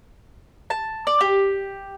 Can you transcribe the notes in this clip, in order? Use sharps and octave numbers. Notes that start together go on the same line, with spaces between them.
A5
D5
G4